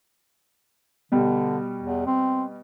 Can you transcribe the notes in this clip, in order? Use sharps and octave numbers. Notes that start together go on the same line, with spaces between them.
B2 D3 G3
E2
C4